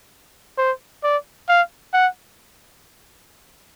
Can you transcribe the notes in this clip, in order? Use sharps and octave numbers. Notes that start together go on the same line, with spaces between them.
C5
D5
F5
F#5